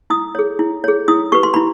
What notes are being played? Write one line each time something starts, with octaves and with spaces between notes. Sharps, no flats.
E4 D#6
G#4 C#5
E4
G#4 C#5
E4 D#6
G4 B4 C#6
C6
E4 B5